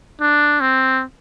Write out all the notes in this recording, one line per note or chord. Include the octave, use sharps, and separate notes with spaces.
D4
C4